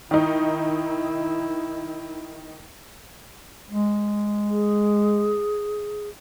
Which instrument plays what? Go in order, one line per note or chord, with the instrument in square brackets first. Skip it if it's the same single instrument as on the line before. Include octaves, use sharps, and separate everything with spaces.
[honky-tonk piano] D#3 D#4 [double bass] E4
[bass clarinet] G#3
[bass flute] G#4